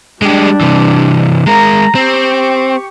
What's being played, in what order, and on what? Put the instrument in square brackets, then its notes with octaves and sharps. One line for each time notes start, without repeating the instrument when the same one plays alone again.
[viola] G3 D4 [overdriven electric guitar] G#3 G4
[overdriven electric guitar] C3 E3
[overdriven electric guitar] G#3 A#4 [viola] A#5
[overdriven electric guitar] C4 [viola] G4 C#6